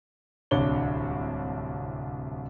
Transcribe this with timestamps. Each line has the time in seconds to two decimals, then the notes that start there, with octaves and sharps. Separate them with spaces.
0.51 D1 C2 D4 C#5 G7